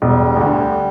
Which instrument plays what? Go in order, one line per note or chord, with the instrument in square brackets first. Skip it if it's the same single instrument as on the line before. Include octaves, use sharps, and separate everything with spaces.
[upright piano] E1 [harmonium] G3
[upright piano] D2 D3